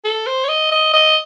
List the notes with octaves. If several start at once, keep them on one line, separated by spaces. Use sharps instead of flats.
A4
C5
C#5
D#5
D#5
D#5